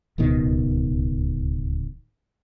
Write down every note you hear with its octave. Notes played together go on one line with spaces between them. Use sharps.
D1 C#2 B2 D#3